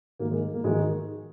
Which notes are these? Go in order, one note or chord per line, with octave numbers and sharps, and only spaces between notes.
G#2 D#3 A#3
G#3
A#3
G#2 D#3 G#3